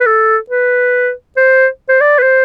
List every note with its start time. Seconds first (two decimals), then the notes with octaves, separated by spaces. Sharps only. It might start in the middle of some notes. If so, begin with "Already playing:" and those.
0.01 B4
0.06 A4
0.50 B4
1.37 C5
1.89 C5
2.01 D5
2.18 B4
2.22 C5